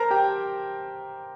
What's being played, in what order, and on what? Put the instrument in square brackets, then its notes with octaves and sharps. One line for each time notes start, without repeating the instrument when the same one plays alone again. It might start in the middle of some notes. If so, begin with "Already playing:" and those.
Already playing: [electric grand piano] A#4 C5 A5 A#5
G4 G5